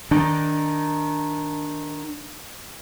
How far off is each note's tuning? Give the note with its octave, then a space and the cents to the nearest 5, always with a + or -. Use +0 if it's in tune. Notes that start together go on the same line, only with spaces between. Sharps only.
D#3 +0 D4 +0